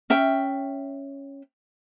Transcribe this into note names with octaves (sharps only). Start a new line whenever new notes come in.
C#4 E5 G5